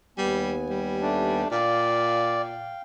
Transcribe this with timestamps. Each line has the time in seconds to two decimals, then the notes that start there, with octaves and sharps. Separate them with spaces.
0.18 D#2 G3 B3 G#5
0.70 G3
1.02 A3 D4
1.52 A#2 D5 F5 G5